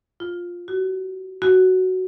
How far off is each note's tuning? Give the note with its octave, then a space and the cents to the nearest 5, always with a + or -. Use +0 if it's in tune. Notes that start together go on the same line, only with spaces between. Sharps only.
F4 +10
F#4 +30
F#4 +5